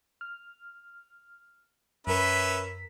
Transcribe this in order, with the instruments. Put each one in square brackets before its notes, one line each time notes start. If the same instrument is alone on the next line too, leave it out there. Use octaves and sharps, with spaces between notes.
[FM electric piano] F6
[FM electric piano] F#2 A#4 B6 [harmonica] C#4 B4 E5